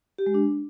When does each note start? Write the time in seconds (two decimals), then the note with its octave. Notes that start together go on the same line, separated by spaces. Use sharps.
0.18 G4
0.26 G#3
0.34 D4